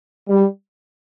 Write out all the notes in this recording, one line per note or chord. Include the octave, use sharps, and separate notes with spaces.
G3